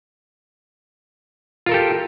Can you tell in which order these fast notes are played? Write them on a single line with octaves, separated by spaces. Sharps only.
F4 A#4 A4 G4